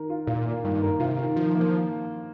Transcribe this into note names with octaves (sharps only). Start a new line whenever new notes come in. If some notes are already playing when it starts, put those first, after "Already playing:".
Already playing: D#3 A#4
F4
A#2 F4
A#3
G2 D#3
A#4
C3 F4
D#3
D#3 F3
A#3
F3